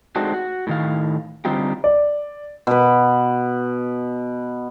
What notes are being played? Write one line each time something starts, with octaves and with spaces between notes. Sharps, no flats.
G#3 A3 C4 D4 D#4 F#4
F#4
A2 D#3 F5
D3 G3 C4 D#4 F4 G4
D5
B2 B4